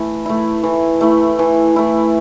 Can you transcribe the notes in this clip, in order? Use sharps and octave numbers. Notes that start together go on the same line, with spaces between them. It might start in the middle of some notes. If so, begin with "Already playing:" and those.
Already playing: E3 A3 E4
A3 E4
E3
A3 E4
E3
A3 E4